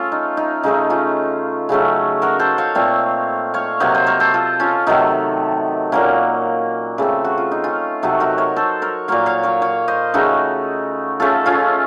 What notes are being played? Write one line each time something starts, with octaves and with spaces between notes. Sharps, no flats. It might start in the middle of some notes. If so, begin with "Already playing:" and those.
Already playing: A3 C#4 F4 A4
D#4
D#4
C#3 A3 C#4 D#4
C#4 F4
C#3 F#3 A3 C#4
F#4 A#4
A4 C5
C#5 F5
A#2 A3 C4
C#5 F5
C3 F#3 A#3 C5 D#5
C5 D#5
A#4 C#5
A4 C5
F4 A4
C#4 F4
C3 D#3 F#3 A3 D#4
A#2 F#3 A#3 C#4
C#3 A3 C4
F#4
F4
D#4
C#4 F4
C3 F#3 A3 C#4 D#4 F#4
F#4 A#4
A#4 C#5
A4 C5
A#4 C#5
A#2 F#3 A#3 C#5 F5
C#5 F5
A#4 C#5
C#5 F5
C5 D#5
C#3 A3 C#4 D#4 F#4
C#3 A3 C#4 F4 A4
C#4 F4